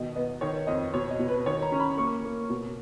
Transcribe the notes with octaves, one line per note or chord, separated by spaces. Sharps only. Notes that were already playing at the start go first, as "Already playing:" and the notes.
Already playing: B2 D#3 D#5
B3 D#5
D#3 C#5
F2 D#5
B2 C#5
D#5
B2
B4
D#3 C#5
A#5
C#4
B5
A#3 C#6
A#3
B2